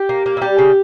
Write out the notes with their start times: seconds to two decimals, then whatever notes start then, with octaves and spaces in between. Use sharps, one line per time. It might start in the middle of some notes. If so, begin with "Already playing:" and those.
Already playing: G4
0.09 A#3
0.26 A#3
0.37 E4
0.41 G3 G4
0.58 C#3